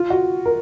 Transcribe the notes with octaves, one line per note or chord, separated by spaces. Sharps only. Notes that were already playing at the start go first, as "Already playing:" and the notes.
Already playing: F4
F#4
A#4